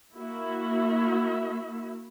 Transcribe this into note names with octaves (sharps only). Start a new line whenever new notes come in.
A#3 E4 F#4 E5